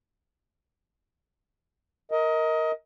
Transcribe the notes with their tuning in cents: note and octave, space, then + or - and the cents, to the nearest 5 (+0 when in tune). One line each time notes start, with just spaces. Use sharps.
A#4 +0 D#5 +25